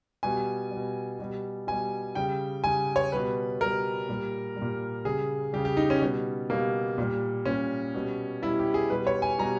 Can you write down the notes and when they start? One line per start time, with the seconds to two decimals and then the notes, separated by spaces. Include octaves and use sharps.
0.23 B2 G3 G#5
0.71 G3
0.76 B2
1.19 B2 G3
1.67 B2 G3 G#5
2.15 C#3 G3 G5
2.64 C#3 G3 G#5
2.96 C#5
3.12 B2 G3 B4
3.60 B2 G3 A#4
4.09 A#2 G3
4.56 G3
4.62 A#2
5.05 C#3 G3 G#4
5.53 C#3 G3 G4
5.65 G4
5.77 D#4
5.90 C#4
6.02 B2 G3
6.50 B2 G3 A#3
6.98 A#2 G3
7.45 A#2 G3 C#4
7.94 B2 G3
8.42 B2 G3 E4
8.59 G4
8.74 G#4
8.90 B2 G3 B4
9.07 C#5
9.22 G#5
9.39 B2 G3 A#5